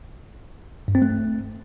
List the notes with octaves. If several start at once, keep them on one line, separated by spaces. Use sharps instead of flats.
G2
C4
A3